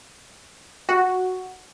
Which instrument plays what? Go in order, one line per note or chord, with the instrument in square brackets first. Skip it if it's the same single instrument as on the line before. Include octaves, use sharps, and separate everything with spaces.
[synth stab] F#4